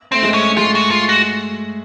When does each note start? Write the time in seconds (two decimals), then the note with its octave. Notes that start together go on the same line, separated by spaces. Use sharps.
0.12 A3 C4
0.23 G#3
0.34 C#4
0.57 G#3 F4
0.75 F#4
0.91 F4
1.09 F#4